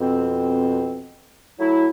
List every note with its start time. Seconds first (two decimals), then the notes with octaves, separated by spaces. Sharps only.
0.01 F2 B2 C4
1.60 F#3 A3 E4